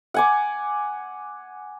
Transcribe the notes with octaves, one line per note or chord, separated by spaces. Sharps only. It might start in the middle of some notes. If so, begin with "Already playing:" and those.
F#5 G#5 D6